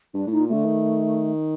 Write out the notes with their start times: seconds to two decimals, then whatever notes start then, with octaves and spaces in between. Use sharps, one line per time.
0.14 G2 D4
0.27 A2 D#4
0.40 A#2
0.48 D3 A3
0.65 D#3